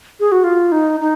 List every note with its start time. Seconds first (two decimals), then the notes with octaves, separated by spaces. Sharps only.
0.20 G#4
0.32 F#4
0.44 F4
0.72 D#4
1.00 D#4